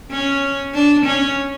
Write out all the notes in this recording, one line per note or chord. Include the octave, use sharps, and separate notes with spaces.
C#4
D4
C#4